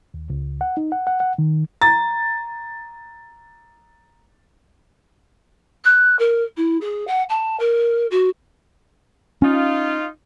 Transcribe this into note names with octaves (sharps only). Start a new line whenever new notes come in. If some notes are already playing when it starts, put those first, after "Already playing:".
D#2
C#2
F#5
D#4
F#5
F#5
F#5
D#3
A#5 A6
F#6
A#4
E4
G#4
F#5
A5
A#4
F#4
C#4 D#4 F4